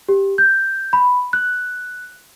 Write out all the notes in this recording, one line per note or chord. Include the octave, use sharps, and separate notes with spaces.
G4
G6
B5
F#6